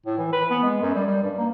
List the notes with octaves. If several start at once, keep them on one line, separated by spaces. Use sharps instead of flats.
A2
E3
B4
B3
G#3
F#2
G3
G3
G2
A#3